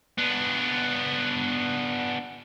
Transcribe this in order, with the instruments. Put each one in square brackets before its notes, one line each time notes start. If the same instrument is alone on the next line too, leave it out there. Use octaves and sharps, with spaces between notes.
[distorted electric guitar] B3 D4